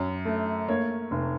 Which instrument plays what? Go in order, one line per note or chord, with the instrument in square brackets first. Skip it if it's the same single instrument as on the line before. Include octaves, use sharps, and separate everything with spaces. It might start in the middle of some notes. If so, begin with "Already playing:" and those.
Already playing: [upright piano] F#2
A3
A#3 C#5
F1